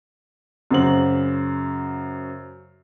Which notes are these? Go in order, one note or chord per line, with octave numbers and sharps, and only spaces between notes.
F#2 C#3 F#4 C5 F#7